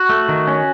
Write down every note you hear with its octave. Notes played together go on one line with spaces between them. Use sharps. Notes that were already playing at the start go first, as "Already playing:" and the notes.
Already playing: F#4
A3
D#3
C#4